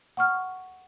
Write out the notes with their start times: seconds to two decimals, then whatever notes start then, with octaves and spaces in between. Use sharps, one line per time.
0.17 F#5 C#6 F6